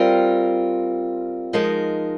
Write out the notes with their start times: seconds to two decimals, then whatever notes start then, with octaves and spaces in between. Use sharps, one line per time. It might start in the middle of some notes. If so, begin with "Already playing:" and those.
Already playing: G3 C4 F4 A#4
1.53 F3 G#3 D#4 A#4